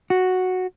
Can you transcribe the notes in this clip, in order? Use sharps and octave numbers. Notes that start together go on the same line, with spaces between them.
F#4